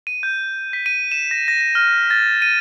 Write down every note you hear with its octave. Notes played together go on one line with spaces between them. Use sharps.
D#7
G6
B6
D#7
E7
A#6
A#6
A#6
F6
A6
D#7